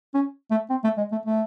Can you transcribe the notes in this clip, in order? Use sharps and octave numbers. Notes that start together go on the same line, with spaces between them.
C#4
A3
C4
A3
G#3
A3
A3